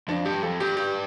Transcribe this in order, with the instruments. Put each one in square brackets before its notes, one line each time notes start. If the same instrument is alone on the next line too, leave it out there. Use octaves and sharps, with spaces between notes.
[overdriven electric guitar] F2 [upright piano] D4
[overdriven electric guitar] G2 [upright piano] G4
[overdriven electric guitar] F2 [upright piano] A4
[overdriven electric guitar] G2 [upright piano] G4
[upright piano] G4